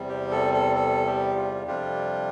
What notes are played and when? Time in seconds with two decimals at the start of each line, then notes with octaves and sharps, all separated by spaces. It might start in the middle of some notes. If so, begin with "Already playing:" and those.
Already playing: E2 C3 G3
0.09 G4
0.31 A4
0.53 A4
0.76 A4
1.06 G4
1.36 F4
1.67 F2 C3 G3 D4 F4 G4